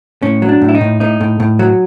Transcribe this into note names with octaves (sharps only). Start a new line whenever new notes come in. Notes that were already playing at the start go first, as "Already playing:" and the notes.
A2 C#4
F#3
D4
A2
E4
D#4
A2
A2 D#4
A2
A2
F#3